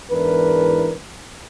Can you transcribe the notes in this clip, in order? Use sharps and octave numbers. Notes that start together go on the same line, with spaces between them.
E2 G#2 E3 D4 A#4 B4